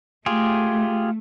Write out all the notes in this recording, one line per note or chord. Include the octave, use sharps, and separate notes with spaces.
A3 F4 G4 G#4